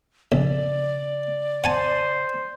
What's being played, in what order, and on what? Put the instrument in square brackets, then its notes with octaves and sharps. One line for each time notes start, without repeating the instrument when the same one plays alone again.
[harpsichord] A#1 [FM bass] C#3 [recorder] D5
[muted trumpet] C5 [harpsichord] F#5 G#5 A5